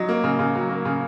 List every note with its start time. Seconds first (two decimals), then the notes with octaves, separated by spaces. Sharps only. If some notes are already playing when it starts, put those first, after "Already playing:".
Already playing: F#3 D#4
0.09 A#3
0.23 C#3
0.39 C#3
0.55 F#3
0.70 A#3
0.85 C#3